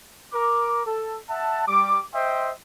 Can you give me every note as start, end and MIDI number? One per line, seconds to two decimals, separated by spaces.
0.33 0.83 70
0.33 0.83 86
0.86 1.18 69
1.29 1.67 76
1.29 1.67 78
1.29 1.67 81
1.67 2.01 55
1.67 2.01 86
2.14 2.52 72
2.14 2.52 75
2.14 2.52 76
2.14 2.52 79
2.14 2.52 84